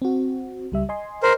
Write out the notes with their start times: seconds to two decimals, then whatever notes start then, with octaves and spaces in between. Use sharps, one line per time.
0.02 C4 F#4
0.72 C#2 G3 E5
0.89 D#5 G#5 C6
1.23 A#4 C5